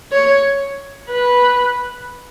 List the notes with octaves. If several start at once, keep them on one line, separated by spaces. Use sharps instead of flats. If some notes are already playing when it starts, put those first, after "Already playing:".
C#5
B4